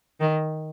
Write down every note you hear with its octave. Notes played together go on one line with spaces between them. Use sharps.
D#3